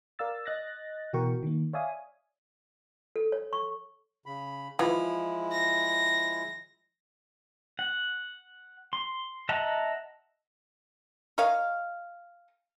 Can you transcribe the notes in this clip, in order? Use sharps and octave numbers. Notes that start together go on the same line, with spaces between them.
A#4 D5 F5 E6 A6
D#5 F#6 A6 A#6
B2 E3 F#4 A#4 G5 C#6
D#3 A#3
C#5 D5 E5 F5 G#5 D#6
A4
C#5
C#6
C#3 B5
E3 F3 G#3 E4
A#6
F#5
C6
D#5 E5 F#5 A5 A#5
A#4 C#5 D#5 F5